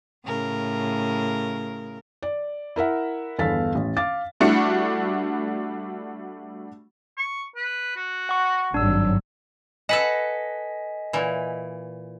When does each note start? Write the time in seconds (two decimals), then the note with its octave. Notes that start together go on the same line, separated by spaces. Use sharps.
0.24 A2 C#3 A#4
2.22 D5
2.76 E4 A#4 E5 F#5
3.38 G1 E2 A4 F5 A6 B6
3.75 A1
3.96 F5 D6 A6
4.40 G3 A3 D4 E4 F#4 C#7
7.17 C#6
7.56 B4
7.96 F#4
8.29 F#5 C#6
8.74 G#1 G2 F#3 D4 E6
9.89 A4 B4 D#5 F#5 G#5 B6
11.13 A#2 E3